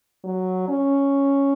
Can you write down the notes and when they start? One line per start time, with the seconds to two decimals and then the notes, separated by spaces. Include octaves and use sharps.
0.24 F#3
0.68 C#4